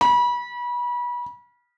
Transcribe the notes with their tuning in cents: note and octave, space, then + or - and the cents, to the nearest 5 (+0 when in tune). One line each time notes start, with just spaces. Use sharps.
B5 -30